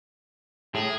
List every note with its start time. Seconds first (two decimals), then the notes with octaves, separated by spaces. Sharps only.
0.75 A2 G#4